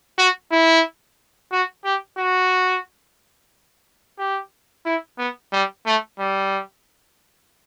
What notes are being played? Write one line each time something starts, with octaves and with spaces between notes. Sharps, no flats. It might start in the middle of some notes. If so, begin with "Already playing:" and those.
F#4
E4
F#4
G4
F#4
G4
E4
B3
G3
A3
G3